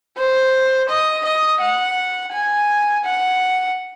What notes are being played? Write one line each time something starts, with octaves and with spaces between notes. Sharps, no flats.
C5
D#5
D#5
F#5
G#5
F#5